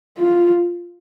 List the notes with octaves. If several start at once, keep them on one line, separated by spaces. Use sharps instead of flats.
F4